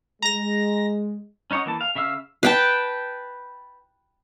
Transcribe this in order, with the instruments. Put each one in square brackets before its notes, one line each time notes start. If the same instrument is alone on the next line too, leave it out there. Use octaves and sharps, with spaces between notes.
[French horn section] G#3 [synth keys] A#5 A#6
[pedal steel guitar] C#4 D#4 C#5 F#5 D#6
E3 A#3 A5
F5
C#3 E5 F5 E6 F6
[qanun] B4 G5 A5